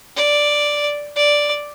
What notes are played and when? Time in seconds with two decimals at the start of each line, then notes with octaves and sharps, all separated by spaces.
0.17 D5
1.16 D5